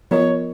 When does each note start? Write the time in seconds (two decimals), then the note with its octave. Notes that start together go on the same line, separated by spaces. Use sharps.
0.11 F3 B3 F4 A#4 C#5 D#5